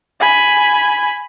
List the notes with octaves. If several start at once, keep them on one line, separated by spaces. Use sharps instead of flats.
G#5 B5